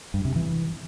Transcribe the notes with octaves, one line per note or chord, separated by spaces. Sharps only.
G2
C3
E3